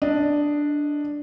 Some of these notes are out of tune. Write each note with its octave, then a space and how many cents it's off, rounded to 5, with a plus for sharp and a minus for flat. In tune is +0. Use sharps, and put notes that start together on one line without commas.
D4 +0 D#5 +0